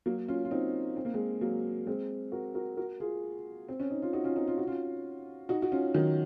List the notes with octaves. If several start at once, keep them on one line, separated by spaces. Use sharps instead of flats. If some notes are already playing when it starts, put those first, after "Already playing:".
F#3 A#3
C#4 F4
F4
C4 D#4
C4
A#3
G#3 C4
F#3 A#3
G#3 C4
F#4 A#4
F#4 A#4
F#4 A#4
F4 G#4
C4
C#4
D#4
F4
D#4 F#4
C#4 F4
C4 D#4
F4
F#4
C#4 F4
D#4 F#4
F#4
C#4 F4
D#3 F#3